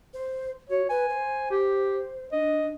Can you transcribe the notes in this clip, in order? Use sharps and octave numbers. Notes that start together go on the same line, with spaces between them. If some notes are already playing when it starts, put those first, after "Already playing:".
C5
F#4 C#5
B4 G#5
C5
G4
D4 D#5